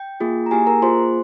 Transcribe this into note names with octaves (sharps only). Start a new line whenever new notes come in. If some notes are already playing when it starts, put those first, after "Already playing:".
Already playing: G5
A#3 F4 G#4
A#5
A#3 E4 G4 G#4 G#5
A#4 A#5
A#3 F4 G#4 C5 C6